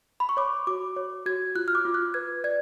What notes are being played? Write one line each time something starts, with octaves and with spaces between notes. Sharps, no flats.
B5
C#6
C#5 D6
F#4 D6
C#5
F#4 G#6
F4 F#6
F6
D6
F4
F#6
B4 G#6
D5 G#6